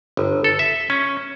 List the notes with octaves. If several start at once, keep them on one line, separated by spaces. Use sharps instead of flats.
G1
A4
E5
C#4